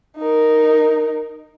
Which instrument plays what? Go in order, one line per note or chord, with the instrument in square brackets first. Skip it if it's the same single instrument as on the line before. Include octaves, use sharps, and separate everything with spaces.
[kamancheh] D#4 A#4